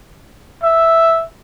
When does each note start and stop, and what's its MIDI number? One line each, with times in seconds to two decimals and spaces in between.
0.63 1.25 76